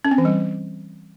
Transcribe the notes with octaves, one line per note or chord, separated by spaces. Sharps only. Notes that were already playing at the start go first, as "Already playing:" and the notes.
C#4
C4
E3
G3